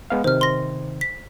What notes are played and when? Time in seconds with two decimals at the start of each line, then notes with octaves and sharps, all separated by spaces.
0.10 G#3 B3 F5
0.24 C3 D#3 C5 F6
0.41 C6 A#6
1.01 B6